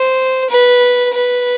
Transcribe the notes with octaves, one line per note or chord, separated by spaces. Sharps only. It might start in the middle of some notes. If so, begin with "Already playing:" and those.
Already playing: C5
B4
B4